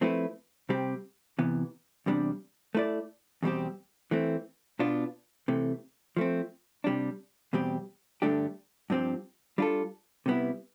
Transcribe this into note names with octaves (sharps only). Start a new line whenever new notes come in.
F3 A3 C4 E4 B4
C3 G3 C4 G4
C3 E3 B3
E2 C3 G3 D4
A3 E4 B4 D5
E2 B2 G3 C4 G4
E3 A3 C4
B2 B3 D4 F4
C3 E3 A3
F3 A3 C4
C3 G3 D4
E2 B2 G3 C4 G4
G2 D3 A3 D4 G4
G2 F3 C4 G4
G3 D4 F4 A4
C3 G3 B3 E4